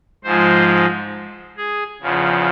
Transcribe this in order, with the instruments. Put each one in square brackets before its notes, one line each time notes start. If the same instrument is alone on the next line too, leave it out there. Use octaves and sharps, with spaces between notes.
[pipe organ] G#2 F3 G#3 C5
G#4
E2 C#3 F3